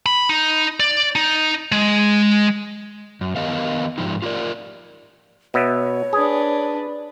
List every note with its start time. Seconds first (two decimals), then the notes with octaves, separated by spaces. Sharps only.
0.06 B5
0.29 D#4
0.80 D5
1.16 D#4
1.72 G#3
3.21 F#2
3.36 D#3 B3 G4 A#4 D#5 F5
3.98 G#2 F3 D#4 G4
4.22 F4 G4 A#4 D5
5.54 B2 B3 C#5 E5
6.13 D4 G#4 B4